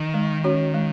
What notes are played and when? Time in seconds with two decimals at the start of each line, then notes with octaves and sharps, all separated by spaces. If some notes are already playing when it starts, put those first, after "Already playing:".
Already playing: D#3
0.14 G#3
0.44 C#4 F#4 C#5
0.74 G#3